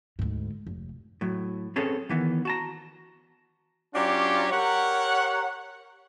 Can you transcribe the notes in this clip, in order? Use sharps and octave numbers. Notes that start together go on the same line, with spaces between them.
D2 G#2
F1
A2 F#3
C4 C#4 G#4 A4 B4 C#5
D#3 E3 B3
F#4 A5 A#5
F#3 C#4 D4 F4 G4 C#5
G4 A#4 C#5 F#5